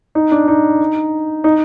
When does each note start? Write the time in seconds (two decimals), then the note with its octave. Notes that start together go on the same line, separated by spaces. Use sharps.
0.15 D#4
0.31 D4
0.48 D#4
1.44 D#4